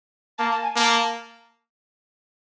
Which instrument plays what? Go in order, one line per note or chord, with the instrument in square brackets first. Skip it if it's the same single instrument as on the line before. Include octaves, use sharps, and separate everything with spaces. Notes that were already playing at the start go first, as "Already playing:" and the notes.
[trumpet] A#3 [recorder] A5
[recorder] A5
G#5
[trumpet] A#3 [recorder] A5